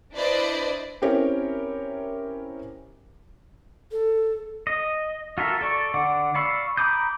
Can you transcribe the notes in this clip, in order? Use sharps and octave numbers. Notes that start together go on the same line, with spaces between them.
D4 E4 B4 C5 D5 D#5
C4 C#4 E4 G4 A#4 C#5
A4
D#5
F4 F#4 A4 A#4 E5
A4 D5 C#6
D3 D5 F#5 D6
D5 F5 B5 C#6 E6
A#5 B5 D6 D#6 G6